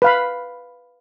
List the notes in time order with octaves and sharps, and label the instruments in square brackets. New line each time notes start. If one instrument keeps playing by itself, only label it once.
[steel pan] B4 F5 B5